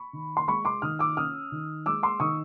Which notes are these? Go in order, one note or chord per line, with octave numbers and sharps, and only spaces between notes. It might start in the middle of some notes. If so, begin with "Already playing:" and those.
Already playing: B5 C#6
D#3
C6
G#3 B5 C#6
C6 D6
D#3 D#6 F6
D6 E6
C#4 D#6 F6
D#3
G#3 D6 E6
C6 D6
D#3 C#6 D#6